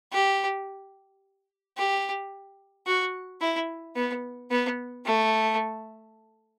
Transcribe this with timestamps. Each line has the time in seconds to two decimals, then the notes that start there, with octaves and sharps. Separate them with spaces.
0.12 G4
1.77 G4
2.87 F#4
3.41 E4
3.96 B3
4.51 B3
5.06 A3